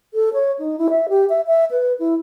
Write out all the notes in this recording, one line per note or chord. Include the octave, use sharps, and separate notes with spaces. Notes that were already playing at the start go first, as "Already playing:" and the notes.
A4
C#5
D#4
E4
E5
G4
E5
E5
B4
E4